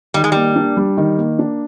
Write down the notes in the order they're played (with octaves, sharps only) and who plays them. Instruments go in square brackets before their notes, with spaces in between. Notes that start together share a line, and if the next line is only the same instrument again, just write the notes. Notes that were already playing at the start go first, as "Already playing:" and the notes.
[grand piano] D#3 [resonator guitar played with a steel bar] G3
[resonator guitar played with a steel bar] G#3
[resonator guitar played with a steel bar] G3 [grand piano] A#3
[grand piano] D4
G3
D#3
A#3
D4